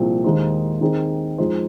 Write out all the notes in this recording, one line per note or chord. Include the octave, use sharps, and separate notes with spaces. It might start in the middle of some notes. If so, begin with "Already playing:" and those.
Already playing: C2 A#2 F3 C4 G#4
D#2 D#3 G#3 D#4 C5
D#2 D#3 C4 D#4 G#4
F2 F3 G#3 D#4 C5